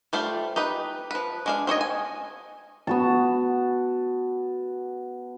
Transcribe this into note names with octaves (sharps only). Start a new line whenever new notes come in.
G3 A3 F4 C5
D#4 G4 B4
F3 B4
G#3 D4 F5
C4 C5 C#5 D#5
G#5
B3 F#4 A5